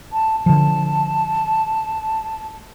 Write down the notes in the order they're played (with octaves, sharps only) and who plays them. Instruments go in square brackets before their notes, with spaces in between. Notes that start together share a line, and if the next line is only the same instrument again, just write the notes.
[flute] A5
[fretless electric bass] D3 F3 [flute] A5